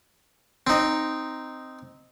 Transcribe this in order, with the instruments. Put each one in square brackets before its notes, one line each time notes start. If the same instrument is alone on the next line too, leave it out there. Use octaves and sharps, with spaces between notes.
[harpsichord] C4 D#4